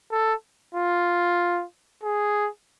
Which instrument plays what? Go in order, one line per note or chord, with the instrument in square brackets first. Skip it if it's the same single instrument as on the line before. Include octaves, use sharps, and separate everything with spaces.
[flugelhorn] A4
F4
G#4